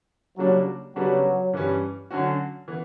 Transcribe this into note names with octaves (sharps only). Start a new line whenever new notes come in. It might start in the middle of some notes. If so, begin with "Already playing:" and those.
C#3 F#3 G3 A#3 D4 F#4
C#3 F#3 G3 B3 D4 F#4
G2 E3 G3 C#4
D3 F#3 C#4 F#4
E3 B3